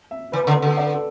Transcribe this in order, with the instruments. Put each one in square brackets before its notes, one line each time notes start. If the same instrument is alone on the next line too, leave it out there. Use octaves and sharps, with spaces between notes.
[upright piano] E5
[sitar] E3 [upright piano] B4
[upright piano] B4
[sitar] D3
[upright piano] A4
B4
[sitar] D3 [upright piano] A4
[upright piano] D5
B4
A4